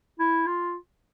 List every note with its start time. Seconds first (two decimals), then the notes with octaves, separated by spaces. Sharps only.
0.19 E4
0.46 F4